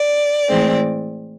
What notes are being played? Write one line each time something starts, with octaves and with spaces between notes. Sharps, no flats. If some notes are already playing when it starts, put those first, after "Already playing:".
Already playing: D5
A2 E3 G#3 C4